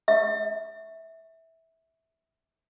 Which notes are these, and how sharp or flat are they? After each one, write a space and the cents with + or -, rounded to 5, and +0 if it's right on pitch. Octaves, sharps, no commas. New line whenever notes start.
E5 -15